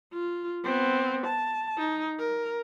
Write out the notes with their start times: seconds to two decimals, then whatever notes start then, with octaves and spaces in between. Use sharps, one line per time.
0.13 F4
0.64 B3 C4
1.26 A5
1.78 D#4
2.19 A#4